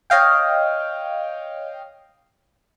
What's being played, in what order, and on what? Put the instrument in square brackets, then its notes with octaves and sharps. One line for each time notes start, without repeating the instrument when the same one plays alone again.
[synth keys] C#5 D#5 F5 G5